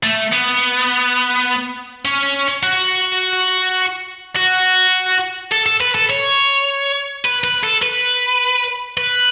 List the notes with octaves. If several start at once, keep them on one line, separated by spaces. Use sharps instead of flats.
A3
B3
C#4
F#4
F#4
A4
A4
B4
A4
C#5
B4
B4
A4
B4
B4